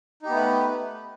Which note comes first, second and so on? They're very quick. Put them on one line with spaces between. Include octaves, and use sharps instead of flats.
D#4 G4 B3 A3 B4